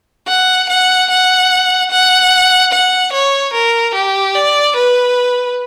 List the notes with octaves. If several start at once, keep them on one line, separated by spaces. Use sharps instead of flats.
F#5
F#5
F#5
F#5
F#5
C#5
A#4
G4
D5
B4